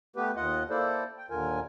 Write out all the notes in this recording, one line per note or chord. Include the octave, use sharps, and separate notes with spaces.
A3 B3 G4 B4
D#2 F4 D#5 F#5
A#3 E4 A4 C5 D5
G5
D#2 A#2 D3 F4 A#4 G#5